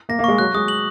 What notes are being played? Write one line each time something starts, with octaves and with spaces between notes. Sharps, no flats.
A#3 A#6
A#3
G#3 C#6
F#3 F#6
G#3 D#6
F#7